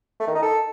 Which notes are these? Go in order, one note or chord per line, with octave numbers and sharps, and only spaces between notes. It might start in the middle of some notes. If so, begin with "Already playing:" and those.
A3
D#3
D#4
A4